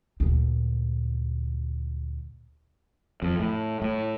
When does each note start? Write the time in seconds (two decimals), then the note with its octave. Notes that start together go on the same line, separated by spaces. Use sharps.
0.20 D2 A#2
3.22 F2
3.40 A2
3.82 A2